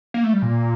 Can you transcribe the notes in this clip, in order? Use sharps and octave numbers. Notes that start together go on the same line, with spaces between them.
A#3
A3
G3
A#2